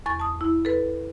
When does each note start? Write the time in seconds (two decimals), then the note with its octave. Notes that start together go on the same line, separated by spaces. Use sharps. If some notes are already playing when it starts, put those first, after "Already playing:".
0.06 E2 C#6 A6
0.20 A5 D#6
0.41 E4
0.65 A4 B4